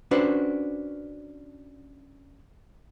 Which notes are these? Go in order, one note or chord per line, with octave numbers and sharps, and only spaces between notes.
C#4 D4 F#4 B4 C5